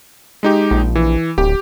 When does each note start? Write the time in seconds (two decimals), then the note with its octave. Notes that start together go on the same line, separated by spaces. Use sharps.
0.43 G#3 D#4 G4
0.71 A#1
0.95 E3
1.38 D1 G4